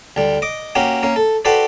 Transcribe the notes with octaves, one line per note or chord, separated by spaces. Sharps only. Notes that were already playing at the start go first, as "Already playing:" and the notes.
D2 G3
D#5 D6
A#3 C#4 F#4 G4
A#3 C#4
A4
F#4 G4 A4 B4 C5 D5